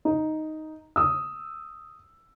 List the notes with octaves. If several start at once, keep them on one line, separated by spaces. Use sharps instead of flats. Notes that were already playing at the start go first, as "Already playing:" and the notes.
D#4
D#6 E6